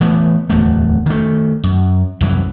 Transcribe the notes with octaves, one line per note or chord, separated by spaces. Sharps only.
E3 A3 B3
D1 E2 F#3 A3
D#3 A3
F#2
C2 F#2 E3